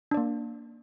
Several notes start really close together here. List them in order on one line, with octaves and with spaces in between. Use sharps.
D4 D5 A#3